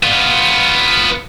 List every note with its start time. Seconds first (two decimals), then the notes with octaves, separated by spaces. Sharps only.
0.03 B3 F4